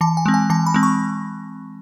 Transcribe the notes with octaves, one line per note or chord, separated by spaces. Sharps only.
E3 A5
G#5
G#3 C4
G#5
E3 A5
B5
G#3 C4
C#6